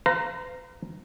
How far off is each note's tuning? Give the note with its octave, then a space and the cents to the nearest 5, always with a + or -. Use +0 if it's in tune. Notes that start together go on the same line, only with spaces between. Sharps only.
B4 +45 F5 +0 A#5 +0